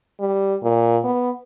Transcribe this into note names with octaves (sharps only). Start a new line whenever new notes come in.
G3
A#2
B3